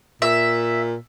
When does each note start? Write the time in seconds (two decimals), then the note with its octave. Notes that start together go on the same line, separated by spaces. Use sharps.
0.22 A#2 E5